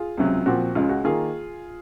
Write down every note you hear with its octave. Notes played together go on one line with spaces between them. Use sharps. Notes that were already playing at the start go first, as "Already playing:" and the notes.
Already playing: F4 G#4
C#2 C3 F#3 C#4
A#2 F3 C4 F#4
C#2 C#3 G#3 C#4 F4
F#4
D#3 A#3 F4 G#4